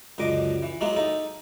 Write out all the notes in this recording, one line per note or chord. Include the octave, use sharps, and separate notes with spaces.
C#2 F#2 D3 D#5 D6
E3
F#3 G#3 A#3 B3 E4
D#4 A4